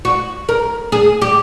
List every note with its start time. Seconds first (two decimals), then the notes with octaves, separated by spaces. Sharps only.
0.05 F#4
0.49 A#4
0.92 G#4
1.22 G4